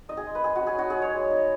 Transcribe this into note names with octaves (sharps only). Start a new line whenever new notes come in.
D#4 D#5
G#4
G#3
B4
G#3 G#4
F#4
C#4
G#4
D#4 F#4
G#4
F#3
C#5
G#3
D#4